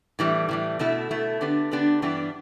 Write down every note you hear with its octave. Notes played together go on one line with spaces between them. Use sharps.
A2 E3 G3
A2 E3 G3
B2 A3 E4
B2 A3 E4
D3 B3 D4 G4 B4
D3 B3 D4 G4 B4
G2 E3 B3 D4 G4